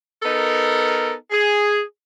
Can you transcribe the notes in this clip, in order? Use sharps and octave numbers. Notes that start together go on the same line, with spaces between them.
B3 D#4 A4 A#4
G#4